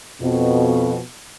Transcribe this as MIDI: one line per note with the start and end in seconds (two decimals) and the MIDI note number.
0.20 0.98 41
0.20 0.98 47